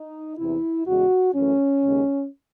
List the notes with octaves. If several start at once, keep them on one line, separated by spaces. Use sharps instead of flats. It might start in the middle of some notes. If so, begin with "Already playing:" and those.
Already playing: D#4
E2 C3 E3 E4
E2 C#3 G#3 F#4
F#2 E3 A3 C#4
D#2 C#3 G#3